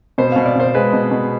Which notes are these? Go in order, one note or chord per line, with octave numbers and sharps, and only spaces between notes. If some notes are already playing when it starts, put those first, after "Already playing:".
B2 C5
B2 F5
D5
B2 C5
G#3 B4
B2
B2